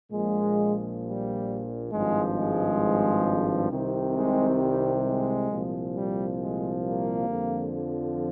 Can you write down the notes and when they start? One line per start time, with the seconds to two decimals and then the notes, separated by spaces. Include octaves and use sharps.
0.12 A#1 A#2 F3 G#3
1.02 G3
1.91 G#1 G2 F3 G#3
2.37 G#3
3.71 C2 C3 D#3
4.15 G#3
4.60 G3
5.06 G#3
5.51 C2 A#2 F3
5.95 G3
6.39 G#3
6.84 G3 A#3
7.29 F2 D3 F3